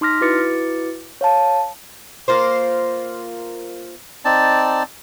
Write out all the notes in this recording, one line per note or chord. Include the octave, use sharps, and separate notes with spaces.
D#4 C6 D6 F6 A#6 B6
E4 F#4 B4 D6 A6 C#7
C#5 F5 A5
A#3 F4 C5
C4 D#4 D5 A5